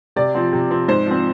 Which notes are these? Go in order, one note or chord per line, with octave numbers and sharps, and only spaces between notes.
C3 D5
F3 C4
C3
F3 C4
G#2 C5
F3 C4